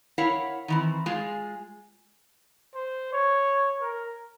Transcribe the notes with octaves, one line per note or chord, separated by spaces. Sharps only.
E4 A#4 C#5 F5 F#5
D#3 E3 C4
G#3 F4 G#4
C5
C#5
A#4